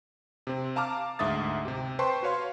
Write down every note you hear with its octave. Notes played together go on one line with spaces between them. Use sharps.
C3 C4
F5 A5 A#5 D6 F6
D2 G#2 E5 D#6 A6
C3 G4
B4 C5 G5 A5 C6 C#6
F#4 B4 C#5 F5 C6